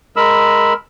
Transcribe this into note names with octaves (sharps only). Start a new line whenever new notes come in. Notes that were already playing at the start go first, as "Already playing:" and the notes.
G#3 A#4 B5 E6